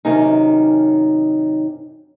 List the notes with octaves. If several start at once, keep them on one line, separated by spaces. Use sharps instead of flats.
F#2 C3 D#3 C#4 D#4